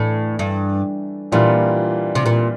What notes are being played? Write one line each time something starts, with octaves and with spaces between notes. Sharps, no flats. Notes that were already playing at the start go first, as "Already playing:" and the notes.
Already playing: A2 E3 A3 D4
G2
A#2 E3 G3 D4 F4
C3
A#2